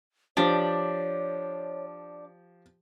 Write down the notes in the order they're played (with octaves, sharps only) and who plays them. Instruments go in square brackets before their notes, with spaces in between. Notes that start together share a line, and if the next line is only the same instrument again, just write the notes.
[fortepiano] F3 G4 [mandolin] D4 D5 [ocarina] C#5